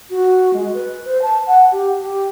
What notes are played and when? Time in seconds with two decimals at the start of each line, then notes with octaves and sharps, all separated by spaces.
0.10 F#4
0.53 G#3
0.74 B4
1.05 C5
1.22 A5
1.47 F#5
1.71 G4
2.01 G4